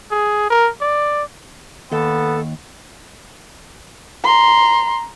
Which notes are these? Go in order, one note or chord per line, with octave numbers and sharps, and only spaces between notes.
G#4
A#4
D5
D#2 B3 A4
A#5 C6